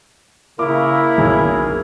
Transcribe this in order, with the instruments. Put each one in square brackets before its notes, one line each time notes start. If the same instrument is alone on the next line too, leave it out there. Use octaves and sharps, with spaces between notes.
[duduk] C#3 [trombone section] A#3 E4 [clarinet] A#4 [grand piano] D6
[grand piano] F#1 B1 [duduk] G#4